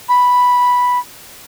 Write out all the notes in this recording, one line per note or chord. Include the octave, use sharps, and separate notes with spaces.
B5